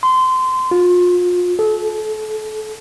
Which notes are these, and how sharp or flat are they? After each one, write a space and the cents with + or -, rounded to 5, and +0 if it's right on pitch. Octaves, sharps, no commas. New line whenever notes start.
C6 -20
F4 +35
A4 -30